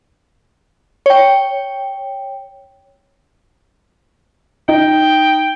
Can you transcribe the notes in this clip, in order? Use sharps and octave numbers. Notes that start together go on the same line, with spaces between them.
C#5 G5
D#4 G5